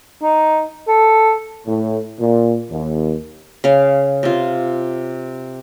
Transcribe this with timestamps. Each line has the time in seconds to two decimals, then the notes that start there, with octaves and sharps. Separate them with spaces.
0.22 D#4
0.88 A4
1.66 A2
2.20 A#2
2.72 D#2
3.64 C#3 F5
4.23 C3 F4